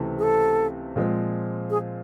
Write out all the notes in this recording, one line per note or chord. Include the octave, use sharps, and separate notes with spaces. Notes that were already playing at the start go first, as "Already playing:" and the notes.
Already playing: C#2 C3 E3 A3
G#4
A4
A#2 F3 G#3 C4
G#4